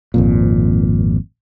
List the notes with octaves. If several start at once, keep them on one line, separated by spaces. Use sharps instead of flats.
G#1 F2 A#2